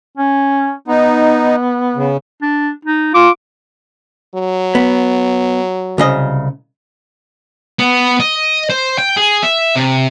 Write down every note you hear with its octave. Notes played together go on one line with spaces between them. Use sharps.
C#4
B3 D#4
C#3
D4
D#4
F4 D6
F#3
B3
C2 C#3 D#5
B3
D#5
C5
G5
G#4
E5
C3